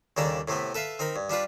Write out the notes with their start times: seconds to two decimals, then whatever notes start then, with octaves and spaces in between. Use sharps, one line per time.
0.17 D#2 C#3 G3 D4 A4 A#5
0.48 A2 C3 A3 B3
0.75 A4 B4 E5 F5
0.99 C4 D#4 A#4 B5
1.16 G2
1.30 G3 D4 F4 B4